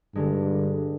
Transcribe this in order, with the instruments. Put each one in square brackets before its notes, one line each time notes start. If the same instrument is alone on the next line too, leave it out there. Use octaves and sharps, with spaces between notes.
[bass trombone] G2 [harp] D3 G#3